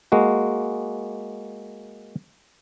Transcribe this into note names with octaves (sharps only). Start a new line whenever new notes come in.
G#3 A#3 F#4